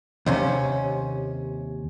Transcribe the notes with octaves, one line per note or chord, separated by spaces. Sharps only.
D#2 C3 C#4